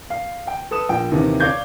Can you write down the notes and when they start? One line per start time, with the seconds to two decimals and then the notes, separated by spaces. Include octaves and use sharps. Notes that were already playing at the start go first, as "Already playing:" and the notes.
0.10 F5
0.47 G5
0.71 A4 B4 D#6 E7
0.89 A#1 A#2 G5
1.11 D#2 C3 D#3 E3
1.40 C#5 D5 F5 D6 G6 G#6